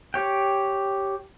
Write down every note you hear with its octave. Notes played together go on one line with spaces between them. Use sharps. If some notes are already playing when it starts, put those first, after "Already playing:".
G4 C#5 G5